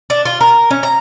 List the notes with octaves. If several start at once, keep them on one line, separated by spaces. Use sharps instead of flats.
D4
F4
A#4
C#4
A#5